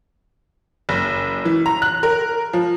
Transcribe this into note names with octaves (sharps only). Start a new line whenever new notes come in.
F#1
E3
A#5
F#6
A#4
F3